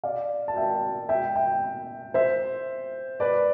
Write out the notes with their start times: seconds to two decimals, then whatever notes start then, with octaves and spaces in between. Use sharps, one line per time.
0.04 D5 F5
0.48 A5
0.56 E5 G5
1.09 E5 G5
1.36 E5 G5
2.14 C5 E5
3.20 B4 D5